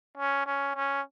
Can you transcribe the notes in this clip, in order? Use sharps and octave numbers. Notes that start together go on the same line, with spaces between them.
C#4
C#4
C#4